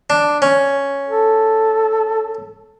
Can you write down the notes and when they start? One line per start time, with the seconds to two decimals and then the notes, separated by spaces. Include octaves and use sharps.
0.10 D4
0.42 C#4
1.09 A4